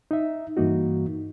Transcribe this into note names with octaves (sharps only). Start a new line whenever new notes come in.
D#4 E5
G2 E3 A#3 D#4 F#4